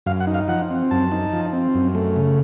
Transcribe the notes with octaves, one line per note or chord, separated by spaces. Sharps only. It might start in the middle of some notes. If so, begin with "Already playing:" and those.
F#2 F5
F#5
D#4
F5
F3 F#5
C4
F#2 A5
D#4
F3
C4
F#2
A3
C#3